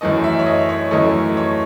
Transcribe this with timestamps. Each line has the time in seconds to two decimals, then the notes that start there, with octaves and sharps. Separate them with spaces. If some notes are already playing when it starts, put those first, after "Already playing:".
0.01 F#2 E3 A3 D#5
0.24 E5
0.39 C#5
0.46 D#5
0.69 C#5
0.91 F#2 E3 A3 D#5
1.37 C#5